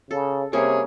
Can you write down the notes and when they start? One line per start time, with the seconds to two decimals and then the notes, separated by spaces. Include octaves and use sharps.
0.11 C#3 A4
0.53 C3 G3 A#3 C#4 G#4 C#5